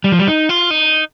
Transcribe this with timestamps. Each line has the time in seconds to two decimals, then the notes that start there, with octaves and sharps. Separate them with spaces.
0.04 G3
0.12 F3
0.19 G3
0.27 D#4
0.49 F4
0.70 D#4